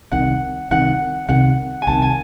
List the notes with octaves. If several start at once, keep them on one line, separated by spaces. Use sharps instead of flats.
C2 C3 D#3 F#5
C2 C3 D#3 F#5
C2 C3 D#3 F#5
G#5
C2 C3 D#3 A5
G#5